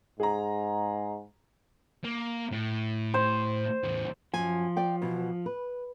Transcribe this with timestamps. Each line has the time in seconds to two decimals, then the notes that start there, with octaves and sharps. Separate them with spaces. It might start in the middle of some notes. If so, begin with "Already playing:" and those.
0.20 G#2 G#4 A#5
2.04 A#3
2.51 A2
3.14 C5
3.83 E2 A2
4.34 F#2 F3 G#5
4.77 D5 G5
5.02 B2 E3
5.46 B4